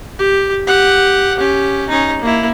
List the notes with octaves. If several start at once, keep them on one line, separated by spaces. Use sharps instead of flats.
G4
G4 F#5
C#4 G4
C#4 D#4
A#3 E4